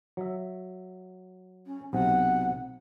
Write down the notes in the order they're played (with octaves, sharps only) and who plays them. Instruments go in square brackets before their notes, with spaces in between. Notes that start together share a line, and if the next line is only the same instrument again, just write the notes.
[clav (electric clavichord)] F#3 E5
[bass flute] C#4
[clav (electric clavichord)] B1 C3 [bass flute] F#5